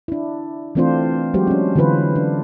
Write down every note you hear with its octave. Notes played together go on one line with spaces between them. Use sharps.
D4 E4
E3 A3 C4 D4 F4 C5
F#3 G#3 F#4 G4 C5
C#4 D4
D3 E3 F4 B4 C5
D4